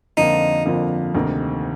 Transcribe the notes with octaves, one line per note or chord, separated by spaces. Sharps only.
F2 D3 F3 A#3 D#4 F4
F2 D3 F3 A#3 F4
D2 C3 D#3 A#3 D#4